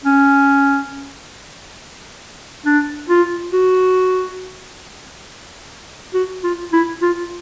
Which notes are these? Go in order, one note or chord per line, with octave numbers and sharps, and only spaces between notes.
C#4
D4
F4
F#4
F#4
F4
E4
F4